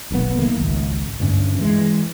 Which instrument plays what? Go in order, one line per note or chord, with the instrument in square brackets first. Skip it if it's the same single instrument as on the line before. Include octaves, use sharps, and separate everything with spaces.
[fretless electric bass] D#1 B1 C3 B3
D#3 A3 A#3
D1 G#1 C#2
D2 G2 C#4
E3 G#3